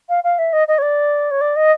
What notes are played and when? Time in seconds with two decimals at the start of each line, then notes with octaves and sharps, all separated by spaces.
0.09 F5
0.24 F5
0.39 E5
0.53 D#5
0.68 D#5
0.78 C#5
0.82 D5
1.31 C#5
1.41 D5
1.56 D#5